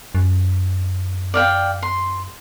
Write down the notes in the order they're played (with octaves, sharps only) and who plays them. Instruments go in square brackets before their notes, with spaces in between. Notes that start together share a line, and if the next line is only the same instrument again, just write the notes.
[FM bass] F#2
[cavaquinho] D5 F5 G5
C6